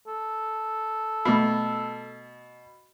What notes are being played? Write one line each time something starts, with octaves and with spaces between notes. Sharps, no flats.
A4
B2 A3 B5